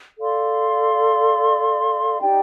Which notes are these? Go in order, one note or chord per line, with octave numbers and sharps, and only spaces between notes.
A4 D5 F5 C6
D#4 G4 D5 G5